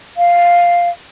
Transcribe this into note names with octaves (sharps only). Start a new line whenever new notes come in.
F5